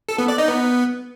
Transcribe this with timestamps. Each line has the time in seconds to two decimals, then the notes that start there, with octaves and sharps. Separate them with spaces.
0.09 A4
0.18 B3
0.28 D5
0.38 D#4
0.48 B3